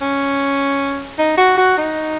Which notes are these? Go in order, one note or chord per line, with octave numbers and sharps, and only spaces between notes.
C#4
D#4
F#4
F#4
D#4